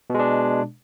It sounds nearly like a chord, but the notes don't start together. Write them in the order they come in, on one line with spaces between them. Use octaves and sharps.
B2 G#3 D4